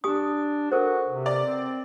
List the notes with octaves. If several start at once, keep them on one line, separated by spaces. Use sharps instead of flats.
D4 G4 G#5 D#6
F#4 A4 A#4 C5
C3
B4 D5
C4